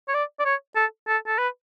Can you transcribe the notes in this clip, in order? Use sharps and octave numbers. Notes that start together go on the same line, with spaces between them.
C#5
D5
D5
C#5
A4
A4
A4
B4